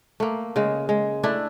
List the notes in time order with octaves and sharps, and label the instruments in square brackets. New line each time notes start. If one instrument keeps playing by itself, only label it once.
[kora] A3 A#3
C#3 G#3
G#3
A3 D4 E4